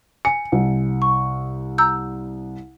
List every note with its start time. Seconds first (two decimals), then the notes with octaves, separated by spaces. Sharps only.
0.25 G#5 C#7
0.52 C2
1.02 C#6
1.78 A#5 E6 G6